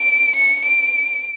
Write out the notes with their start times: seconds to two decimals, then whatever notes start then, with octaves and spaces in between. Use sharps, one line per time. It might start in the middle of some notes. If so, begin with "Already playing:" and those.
Already playing: D7
0.35 C#7
0.65 D7